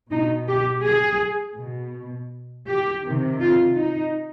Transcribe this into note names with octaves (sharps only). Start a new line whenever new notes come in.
B2 D#4
G4
G#4
B2
G4
C3 D#3
F4
D#4